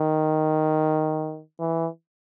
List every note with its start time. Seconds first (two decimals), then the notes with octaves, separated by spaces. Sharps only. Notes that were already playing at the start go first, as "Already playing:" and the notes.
Already playing: D#3
1.60 E3